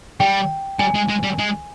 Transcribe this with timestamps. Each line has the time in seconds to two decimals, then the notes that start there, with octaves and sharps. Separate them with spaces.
0.20 G3 G5
0.79 G3 G#5
0.95 G#3
1.09 G#3
1.23 G3
1.38 G#3